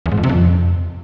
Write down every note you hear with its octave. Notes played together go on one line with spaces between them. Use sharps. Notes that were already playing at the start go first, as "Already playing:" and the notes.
E2
G#2
F2
C3
F2